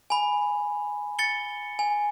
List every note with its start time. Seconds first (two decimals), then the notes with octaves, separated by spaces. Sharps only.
0.10 G#5 B5
1.19 A6 C#7 G7
1.79 G#5